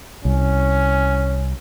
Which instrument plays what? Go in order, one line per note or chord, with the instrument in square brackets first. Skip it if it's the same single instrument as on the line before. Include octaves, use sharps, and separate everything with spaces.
[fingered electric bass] C2 [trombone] C#4